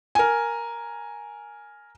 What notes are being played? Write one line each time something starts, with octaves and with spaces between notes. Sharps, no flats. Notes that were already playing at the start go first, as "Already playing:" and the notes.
A#4 G#5